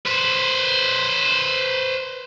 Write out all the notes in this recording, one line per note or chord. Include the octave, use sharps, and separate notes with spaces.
B4 C5